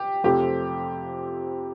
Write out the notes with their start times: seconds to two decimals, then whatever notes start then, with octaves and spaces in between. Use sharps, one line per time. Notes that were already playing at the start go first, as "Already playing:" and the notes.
Already playing: G4
0.24 F2 C3 F3 A3 G4